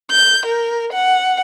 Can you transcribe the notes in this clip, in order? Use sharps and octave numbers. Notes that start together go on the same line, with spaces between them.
G6
A#4
F#5